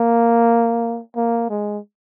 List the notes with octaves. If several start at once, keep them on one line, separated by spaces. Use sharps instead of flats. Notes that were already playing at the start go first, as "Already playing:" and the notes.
Already playing: A#3
A#3
G#3